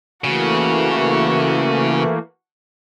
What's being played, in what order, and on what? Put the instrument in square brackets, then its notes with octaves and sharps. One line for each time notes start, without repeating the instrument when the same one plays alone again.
[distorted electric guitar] C#3 [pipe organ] E3 A3 A#3 [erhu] F#4